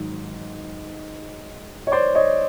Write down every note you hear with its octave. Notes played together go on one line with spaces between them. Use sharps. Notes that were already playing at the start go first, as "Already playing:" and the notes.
Already playing: G#2 D#3 F#3
C#5
C5 D5
C#5 D#5